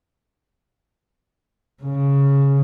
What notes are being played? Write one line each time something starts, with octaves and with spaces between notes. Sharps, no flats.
C#3